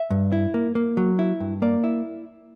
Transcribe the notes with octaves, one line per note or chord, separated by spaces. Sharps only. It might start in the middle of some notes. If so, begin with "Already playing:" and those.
Already playing: E5
G2
E4
A#3
A#3
F#3
E4
G2
A#3 D5
E4